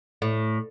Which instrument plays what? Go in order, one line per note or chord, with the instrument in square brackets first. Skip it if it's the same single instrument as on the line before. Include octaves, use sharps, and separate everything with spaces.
[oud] A2